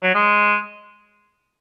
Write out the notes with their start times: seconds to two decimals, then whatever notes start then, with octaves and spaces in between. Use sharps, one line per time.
0.03 F#3
0.15 G#3